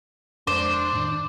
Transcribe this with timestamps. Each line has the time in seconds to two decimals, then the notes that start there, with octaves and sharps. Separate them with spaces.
0.47 F2 G#3 D4 C5 D6
0.93 A2 D#3